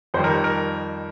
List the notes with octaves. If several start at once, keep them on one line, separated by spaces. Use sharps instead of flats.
F2 D#3 G3 C5
A#4
A#4